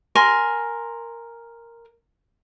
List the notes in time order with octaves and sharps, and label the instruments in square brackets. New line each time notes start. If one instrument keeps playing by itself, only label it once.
[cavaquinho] A#4 G#5 C6